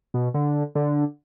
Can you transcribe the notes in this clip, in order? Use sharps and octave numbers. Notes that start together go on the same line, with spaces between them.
B2
D3
D3